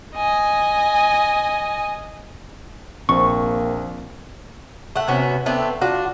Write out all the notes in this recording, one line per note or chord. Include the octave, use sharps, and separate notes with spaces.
D#5 G#5
A#1 A#3 C4 C5 C#6
A3 F#5
C3 B3 C#4 F#4
A3 B3 C4 D4
D4 F4 F#4